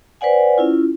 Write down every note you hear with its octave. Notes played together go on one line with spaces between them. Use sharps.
B4 C5 D5 F#5 G#5
C#4 E4 F4